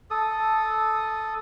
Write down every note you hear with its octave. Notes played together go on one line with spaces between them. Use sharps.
A4 D#6